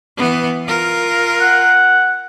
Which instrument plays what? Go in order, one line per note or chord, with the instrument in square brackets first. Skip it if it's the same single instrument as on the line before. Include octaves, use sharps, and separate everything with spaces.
[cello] E3 B3
F4 A#4
[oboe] F#5